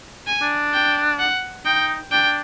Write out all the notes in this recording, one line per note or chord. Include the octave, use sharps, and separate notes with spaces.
G#5
D4
G5
F#5
D#4 G5
D4 G5